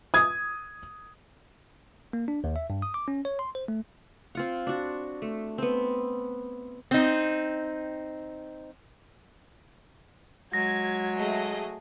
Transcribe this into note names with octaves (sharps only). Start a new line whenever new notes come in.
D#6 G#6
A#3
D4
D#2
E5
G2
D#6
D6
C#4
C#5
C6
C5
A3
C4 F4 F#5
D4 F#4
A3
B3 C4
C4 D#4
F#3 G#3 G#6 A#6
A3 G#4 D#5